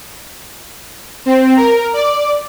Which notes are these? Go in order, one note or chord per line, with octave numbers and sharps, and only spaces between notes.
C4
A#4
D5